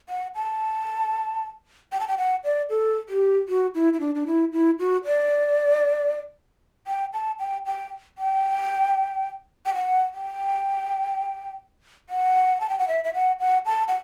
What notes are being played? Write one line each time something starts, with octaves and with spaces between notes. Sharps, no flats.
F#5
A5
G5
A5
G5
F#5
D5
A4
G4
F#4
E4
E4
D4
D4
E4
E4
F#4
D5
G5
A5
G5
G5
G5
G5
F#5
G5
F#5
A5
G5
F#5
E5
E5
F#5
F#5
A5
F#5